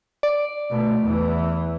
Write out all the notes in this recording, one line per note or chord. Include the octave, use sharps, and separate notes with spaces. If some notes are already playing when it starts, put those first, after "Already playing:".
D5
B2 A3
E2 E3